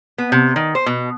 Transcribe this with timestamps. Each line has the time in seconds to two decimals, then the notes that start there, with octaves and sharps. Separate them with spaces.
0.18 B3
0.32 C3
0.56 D#3
0.75 C5
0.86 B2